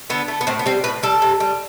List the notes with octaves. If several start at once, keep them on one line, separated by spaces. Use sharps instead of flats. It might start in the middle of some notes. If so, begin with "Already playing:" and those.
D3 B3
A3
B3
A2 C4
B3
G3 C4
A2 B4
G3 A4
C3
G3